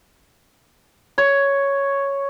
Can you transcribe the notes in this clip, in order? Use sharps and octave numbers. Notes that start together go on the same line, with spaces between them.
C#5